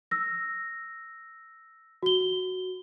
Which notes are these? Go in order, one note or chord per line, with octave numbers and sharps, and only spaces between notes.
E6 A#6
F#4 G7